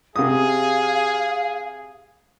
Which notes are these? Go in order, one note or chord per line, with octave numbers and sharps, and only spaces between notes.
C3 G#4 F5 D#6